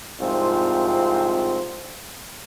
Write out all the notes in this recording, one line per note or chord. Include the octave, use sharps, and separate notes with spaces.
C2 G#2 F3 C4 F4